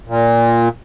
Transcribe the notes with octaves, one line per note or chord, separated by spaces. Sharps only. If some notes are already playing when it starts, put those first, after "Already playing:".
A#2